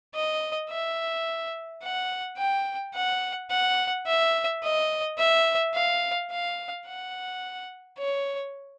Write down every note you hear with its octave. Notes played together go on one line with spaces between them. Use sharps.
D#5
E5
F#5
G5
F#5
F#5
E5
D#5
E5
F5
F5
F#5
C#5